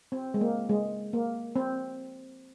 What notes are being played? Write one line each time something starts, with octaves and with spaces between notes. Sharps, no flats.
C4
G#3
A#3
G#3
A#3
C4